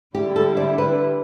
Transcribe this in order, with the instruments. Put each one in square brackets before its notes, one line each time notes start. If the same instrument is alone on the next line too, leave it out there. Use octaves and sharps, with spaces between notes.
[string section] D3 G3 E4 [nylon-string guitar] G4
[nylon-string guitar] A4
D5
B4